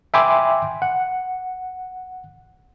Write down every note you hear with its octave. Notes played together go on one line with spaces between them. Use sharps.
E5 G5 G#5 B5 C6 D6
F#5